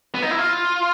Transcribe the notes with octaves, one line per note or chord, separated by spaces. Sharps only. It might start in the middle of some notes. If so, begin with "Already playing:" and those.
B3
D#4
E4
F4